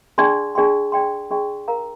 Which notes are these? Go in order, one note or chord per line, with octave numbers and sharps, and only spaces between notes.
D4 G#4 D5 G5 C6
D4 G#4 D5 G5 C6
D4 G#4 D5 G5 C6
D4 G#4 D5 G5 C6
A#4 F5 A#5